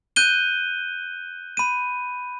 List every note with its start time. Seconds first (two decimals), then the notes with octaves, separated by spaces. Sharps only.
0.16 F#6 G6 D#7 G7
1.57 B5 D#7